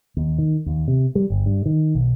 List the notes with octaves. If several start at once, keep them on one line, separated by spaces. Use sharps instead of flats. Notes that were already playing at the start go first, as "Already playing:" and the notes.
D#2
D#3
D#2
C3
G3
G1
G2
D#3
B1